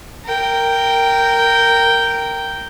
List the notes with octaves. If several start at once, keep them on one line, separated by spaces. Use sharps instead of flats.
A#4 G5